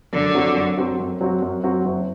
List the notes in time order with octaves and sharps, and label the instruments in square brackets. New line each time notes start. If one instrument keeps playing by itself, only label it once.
[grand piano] F#2 [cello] D3
[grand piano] F#3 C4 F#4
F#2
F#3 C4 F#4
F#2
F#3 C4 F#4
F#2
F#3 C4 F#4
F#1